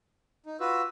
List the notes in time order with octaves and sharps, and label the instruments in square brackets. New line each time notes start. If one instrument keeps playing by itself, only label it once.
[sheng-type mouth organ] D#4
[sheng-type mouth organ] F4 F#4 B4 [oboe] E6